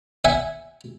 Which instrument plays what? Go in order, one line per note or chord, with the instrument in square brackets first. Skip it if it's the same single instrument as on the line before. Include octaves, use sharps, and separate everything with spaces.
[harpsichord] E5 F#5 G#5